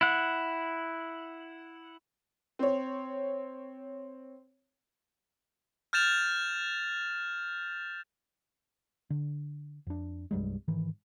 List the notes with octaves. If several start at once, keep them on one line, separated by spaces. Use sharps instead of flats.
E4 F#5
C4 C#5
F6 G6 A6 E7 F7
D3
F2 D4
C2 G2 F#3 G#3
G#2 D#3 E3